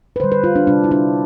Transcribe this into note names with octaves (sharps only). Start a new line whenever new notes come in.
B4
D3 G3 C5
B4
F4
D4
C3 G3 D4
E4
D4